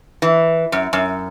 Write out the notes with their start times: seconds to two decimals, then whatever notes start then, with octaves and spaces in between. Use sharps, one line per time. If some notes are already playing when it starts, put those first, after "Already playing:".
0.22 E3
0.72 F#2
0.93 F#2